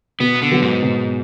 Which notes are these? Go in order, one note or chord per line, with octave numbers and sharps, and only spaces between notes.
B2 B3
D3
F#3 B3
G#2
B2